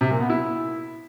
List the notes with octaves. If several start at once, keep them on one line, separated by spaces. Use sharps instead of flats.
C3
A#2
B3
E4